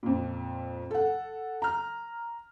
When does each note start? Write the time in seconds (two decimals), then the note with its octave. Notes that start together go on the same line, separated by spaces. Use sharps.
0.03 F2 A#2
0.91 A4 F#5
1.62 A#5 F6